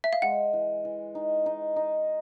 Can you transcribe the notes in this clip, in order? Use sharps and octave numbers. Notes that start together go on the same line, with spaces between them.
E5
F5
G#3 F#5
E3
E3
D#4
D#4
D#4